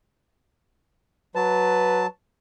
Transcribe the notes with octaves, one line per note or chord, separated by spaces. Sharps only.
F#3 B4 A5